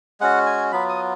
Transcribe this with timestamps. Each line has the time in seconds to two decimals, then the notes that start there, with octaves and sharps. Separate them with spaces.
0.20 G#3 C#4 F#4 F#5
0.46 G#5
0.72 F#3 B3 F4 B5
0.89 D#6